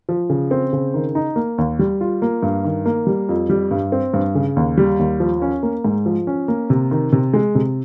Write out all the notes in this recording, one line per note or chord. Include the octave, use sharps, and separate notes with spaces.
F3
C#3
C4
C#3
D#3
D#4
A#3
D#2
G3
F4
A#3
G2
D#3
A#3
G3
F2
G3
G2
C4
G2
C#3
D#2
G3
D#2
F3
C#4
A#3
G#2
F3
C#4
A#3
C3
D#3
C3
G#3
C3